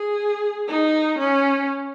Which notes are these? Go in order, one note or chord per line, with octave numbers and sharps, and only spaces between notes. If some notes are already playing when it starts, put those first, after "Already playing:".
Already playing: G#4
D#4
C#4